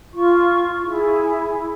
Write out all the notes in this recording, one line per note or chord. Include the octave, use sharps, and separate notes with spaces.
F4 C#6
E4 G#4